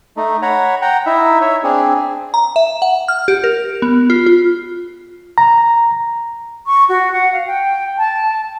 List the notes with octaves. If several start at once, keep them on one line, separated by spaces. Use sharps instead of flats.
A3 D#4
C#5 F#5 A#5 B5
F#5 G5 A#5
D#4 E4 E5
C#5 E5
C4 D4 G#4
A#5
E5
F#5
F6
G4
A#4
B3
F4
F4
A#5
C#6
F#4
F#5
F5
G5
A5